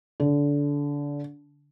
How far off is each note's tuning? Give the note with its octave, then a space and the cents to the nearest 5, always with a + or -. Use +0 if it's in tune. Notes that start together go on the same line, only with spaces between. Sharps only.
D3 -20